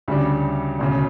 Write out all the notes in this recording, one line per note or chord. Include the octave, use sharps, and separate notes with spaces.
D2 C#3 G3 D4
E1 D2 C#3